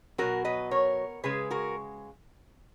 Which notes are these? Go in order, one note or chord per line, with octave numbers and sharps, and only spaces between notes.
B2 F#3 F#4 A#4
B4 D#5
A#4 C#5
C#3 G#3 G#4 B4
F#4 A#4